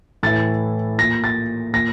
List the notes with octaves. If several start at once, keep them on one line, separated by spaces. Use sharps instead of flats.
A2 E3 A6
A#2 A#6
A6
A#2 A#6